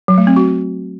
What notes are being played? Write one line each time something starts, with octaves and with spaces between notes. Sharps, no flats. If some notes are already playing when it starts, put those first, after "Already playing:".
F#3
A3
C4
F#4